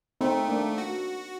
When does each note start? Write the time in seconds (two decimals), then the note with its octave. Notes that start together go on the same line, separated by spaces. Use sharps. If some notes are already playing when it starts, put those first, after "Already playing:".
0.21 A3 C4 D#4
0.49 A#3 D4
0.78 F#4